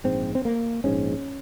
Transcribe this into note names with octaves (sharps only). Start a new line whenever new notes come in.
A#1 G#2 C4
C4
A#3
A#1 G#2 C#4